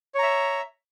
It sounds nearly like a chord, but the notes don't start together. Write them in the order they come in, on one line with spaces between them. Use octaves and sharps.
C#5 A#5 E5